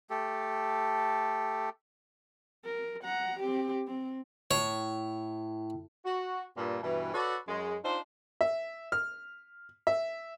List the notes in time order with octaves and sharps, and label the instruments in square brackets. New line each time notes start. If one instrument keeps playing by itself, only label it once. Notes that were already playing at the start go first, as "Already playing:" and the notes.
[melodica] A3 G4 A4
[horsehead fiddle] A#4
F#5 A#5
C4 G4
C4
[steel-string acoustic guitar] A2 [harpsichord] C#5
[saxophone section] F#4
G2 A#2
G2 B2 E3
F#4 A4 B4 C#5 D5
F#2 G#3
D4 D#4 F4 C5
[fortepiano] E5
F6
E5